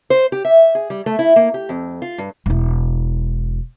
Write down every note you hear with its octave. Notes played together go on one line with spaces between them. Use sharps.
C5
G4
E5
G#4
G3
A3
E4
A#3
G4
F2
F4
G2
E1 E4